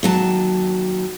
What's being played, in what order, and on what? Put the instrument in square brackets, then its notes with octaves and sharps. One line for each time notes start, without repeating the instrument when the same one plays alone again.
[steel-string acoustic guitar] D#2 F#3 A5